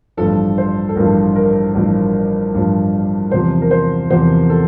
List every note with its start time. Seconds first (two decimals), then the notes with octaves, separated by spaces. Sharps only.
0.17 A1 G2 F3 A4
0.58 C5
0.89 A4
0.96 A1 G2 F3 A#4
1.36 A#4
1.75 A1 G2 F3
2.54 A1 G2 F3
3.31 E2 C3 F3 C5
3.62 A#4
3.71 C5
4.10 E2 C3 F3 C5
4.50 A4